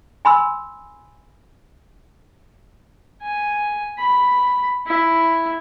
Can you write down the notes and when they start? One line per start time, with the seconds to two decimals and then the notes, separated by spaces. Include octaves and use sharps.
0.25 G#5 B5 C6 E6
3.22 G#5
3.98 B5
4.87 E4